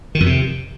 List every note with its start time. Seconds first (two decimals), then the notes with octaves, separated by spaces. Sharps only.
0.15 D#3
0.20 F2
0.26 C3